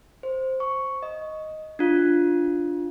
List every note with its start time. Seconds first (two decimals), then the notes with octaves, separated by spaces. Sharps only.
0.23 C5
0.60 C#6
1.03 D#5
1.79 D4 F4